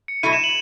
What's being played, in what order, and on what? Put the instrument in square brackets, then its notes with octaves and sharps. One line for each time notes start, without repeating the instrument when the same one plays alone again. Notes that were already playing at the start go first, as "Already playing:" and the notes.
[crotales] C#7
[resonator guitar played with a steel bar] B2 F#3 A3 E4 [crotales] D#7
[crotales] E7
F#7